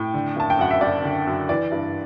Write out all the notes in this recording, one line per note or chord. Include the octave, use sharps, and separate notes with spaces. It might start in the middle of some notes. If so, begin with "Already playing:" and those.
Already playing: A2 G5
D3
F#1 A5
G5
F#2 F#5
E5
F#1 D5
D3
F#2
E3 D5
G2